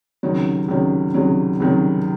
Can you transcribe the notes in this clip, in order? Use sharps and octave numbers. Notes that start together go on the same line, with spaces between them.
C#2 C3 D#3 F#3
C#2 C3 D#3 F#3
C#2 C3 D#3 F#3
C#2 C3 D#3 F#3